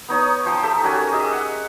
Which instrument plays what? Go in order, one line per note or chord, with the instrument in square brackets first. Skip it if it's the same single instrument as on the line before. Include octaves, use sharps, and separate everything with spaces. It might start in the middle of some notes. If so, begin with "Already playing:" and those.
[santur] B3 D#4 C#5 D#6
F3 C5 G5 D#6
D#4 G4 A4 E5
C#4 F#4 A#4 G#5
G4 G#4 D#5 E5
F#5